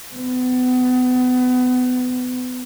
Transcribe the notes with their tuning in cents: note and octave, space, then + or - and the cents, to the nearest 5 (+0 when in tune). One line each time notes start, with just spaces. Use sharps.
B3 +30